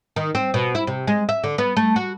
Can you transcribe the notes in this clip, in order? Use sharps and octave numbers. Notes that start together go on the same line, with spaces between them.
D#3
C4
B2
E4
C3
G#3
E5
D3
B3
A3
F#4